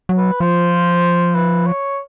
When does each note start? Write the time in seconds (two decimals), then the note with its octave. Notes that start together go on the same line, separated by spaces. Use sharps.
0.09 F#3
0.17 B4
0.40 F3 C5
1.35 B4
1.66 C#5